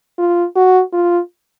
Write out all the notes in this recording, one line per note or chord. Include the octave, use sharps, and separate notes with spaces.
F4
F#4
F4